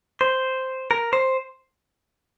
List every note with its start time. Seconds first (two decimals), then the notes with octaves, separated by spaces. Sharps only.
0.21 C5
0.91 A#4
1.13 C5